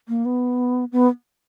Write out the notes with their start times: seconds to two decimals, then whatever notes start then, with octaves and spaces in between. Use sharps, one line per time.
0.08 A#3
0.25 B3
0.92 B3